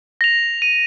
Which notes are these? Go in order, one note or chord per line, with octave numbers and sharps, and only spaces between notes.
A#6 F7
D#7